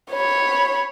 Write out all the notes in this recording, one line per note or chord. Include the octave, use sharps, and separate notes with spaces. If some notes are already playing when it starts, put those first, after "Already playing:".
C#5 B5